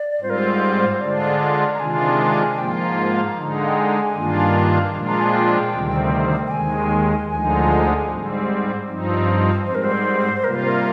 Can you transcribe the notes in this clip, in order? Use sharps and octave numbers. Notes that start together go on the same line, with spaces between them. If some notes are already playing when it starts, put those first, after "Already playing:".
Already playing: D5
G#2 G3 C4 F4 C5
A#4
C5
D3 G#3 D4 F4 D5
A#5
C3 D#3 G#3 D4 F4 G#5
G#2 F3 A#3 F4 G5
A#5
D3 G#3 D#4
F5
G5
G#5
G2 D#3 A#3 D4 F4
F5
A#2 F3 G#3 D4 F4
A#5
G#5
G5
D2 C3 D#3 G3 C4
G5
D#2 D#3 G#3 G#5
D2 D3 F3 G#3 D#4 G#5
G#2 G3 C4
G2 F3 C4 D#4
G#2 G3 C4 C5
A#4
C5
C3 G3 A#3 F4 A#4
C5
A#4